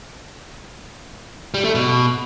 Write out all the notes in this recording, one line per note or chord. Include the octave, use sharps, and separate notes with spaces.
G3
A3
B2